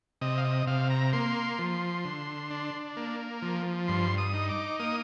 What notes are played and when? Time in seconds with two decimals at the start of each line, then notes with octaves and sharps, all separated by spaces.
0.21 C3 D#5
0.38 F5
0.44 D#5
0.67 C3 F5
0.90 A#5
1.13 A#3 C6
1.59 F3
2.05 D3
2.50 D4
2.96 A#3
3.42 F3
3.88 G2 C6
4.18 D#6
4.34 D#4
4.49 D6
4.80 A#3 D#6